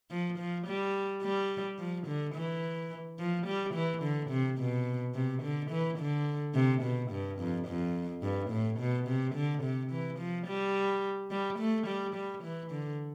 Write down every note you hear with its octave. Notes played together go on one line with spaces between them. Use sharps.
F3
F3
G3
G3
F3
D3
E3
F3
G3
E3
D3
C3
B2
C3
D3
E3
D3
C3
B2
G2
F2
F2
G2
A2
B2
C3
D3
C3
E3
F3
G3
G3
A3
G3
G3
E3
D3